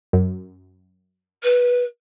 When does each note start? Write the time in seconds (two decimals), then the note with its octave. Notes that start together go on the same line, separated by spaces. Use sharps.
0.13 F#2
1.43 B4